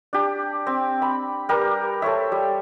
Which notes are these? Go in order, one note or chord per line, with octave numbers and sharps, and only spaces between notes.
D4 G4
C4
B5
G3 G4 A#4 B4
A4 C5 C#5 E5
G3